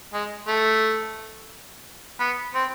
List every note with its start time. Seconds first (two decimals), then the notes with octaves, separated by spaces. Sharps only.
0.13 G#3
0.48 A3
2.20 B3
2.54 C4